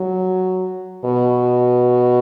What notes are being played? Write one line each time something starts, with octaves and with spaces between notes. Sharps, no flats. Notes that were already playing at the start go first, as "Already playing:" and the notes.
Already playing: F#3
B2